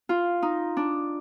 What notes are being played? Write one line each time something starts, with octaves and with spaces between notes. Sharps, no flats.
F4
D#4
D4